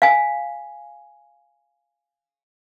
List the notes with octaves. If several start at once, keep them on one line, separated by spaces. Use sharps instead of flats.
F5 G#5